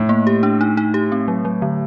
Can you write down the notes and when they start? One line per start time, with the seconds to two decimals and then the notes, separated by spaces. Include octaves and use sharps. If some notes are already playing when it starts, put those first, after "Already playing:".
Already playing: A2
0.09 A#3
0.27 G4
0.43 D4
0.61 D#4
0.77 D#4
0.94 G4
1.12 C4
1.28 F#3
1.45 F#3
1.62 D3